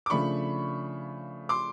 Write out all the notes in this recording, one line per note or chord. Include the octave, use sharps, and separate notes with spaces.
D6
C#3 F3 A3 D4 B5 C#6
C6 D6